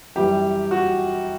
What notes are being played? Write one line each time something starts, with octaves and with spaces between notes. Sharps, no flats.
F#2 E3 G3 G4
F#4